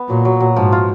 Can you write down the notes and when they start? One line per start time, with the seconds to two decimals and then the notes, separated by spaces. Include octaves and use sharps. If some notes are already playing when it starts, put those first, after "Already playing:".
Already playing: B3
0.09 A#2 F#3
0.25 F#3
0.40 F#3
0.56 G#2 F3
0.72 F4